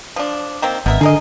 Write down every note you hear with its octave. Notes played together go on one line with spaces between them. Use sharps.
F3 D4
D#3 A#3 C4
G#1 B2 A#4 E5
D3 G#4 A#4 D#5